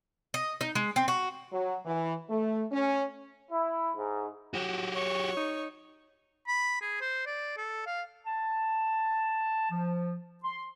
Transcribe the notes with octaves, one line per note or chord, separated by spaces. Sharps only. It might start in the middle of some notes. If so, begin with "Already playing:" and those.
D#5
D#4
G#3
C4
F#4
F#3
E3
A3
C#4
E4
G#2
F#3 F#4 G4
C#5 C#6
D#4
B5
G#4
C5
D5
A4
F5
A5
F3
C6